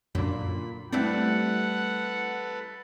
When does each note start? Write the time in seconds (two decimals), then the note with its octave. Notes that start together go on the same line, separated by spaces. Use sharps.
0.15 F#2 A#2 D3 B5
0.93 G3 A3 C4 D4 E4 A4 B4 F#5